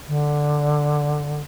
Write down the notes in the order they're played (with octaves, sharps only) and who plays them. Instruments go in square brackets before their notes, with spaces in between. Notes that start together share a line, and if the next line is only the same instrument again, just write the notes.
[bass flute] D3